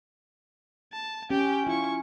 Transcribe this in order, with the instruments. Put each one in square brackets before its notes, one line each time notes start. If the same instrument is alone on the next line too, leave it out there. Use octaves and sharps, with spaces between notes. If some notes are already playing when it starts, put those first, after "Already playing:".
[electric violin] A5
[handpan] C#4 [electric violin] G4 G5
[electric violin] E4 C#6 [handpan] F4